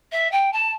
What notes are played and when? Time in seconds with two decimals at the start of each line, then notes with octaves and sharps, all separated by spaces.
0.12 E5
0.31 G5
0.52 A5